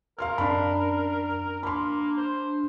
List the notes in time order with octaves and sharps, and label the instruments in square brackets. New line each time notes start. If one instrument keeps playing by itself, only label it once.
[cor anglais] A#4 [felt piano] F5 C6 F6
[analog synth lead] F#2 [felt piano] D4 B5
[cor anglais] A#3 [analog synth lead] D4 [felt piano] B5 C6
[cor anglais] C5